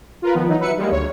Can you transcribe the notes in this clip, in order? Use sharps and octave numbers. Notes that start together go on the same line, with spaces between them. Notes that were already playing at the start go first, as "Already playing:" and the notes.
F4 A#4 B4
D#3 F3 B3
E3 F#3 D#4
F#3 B4 E5 C#7
G3 G#3 A#3
D2 C#5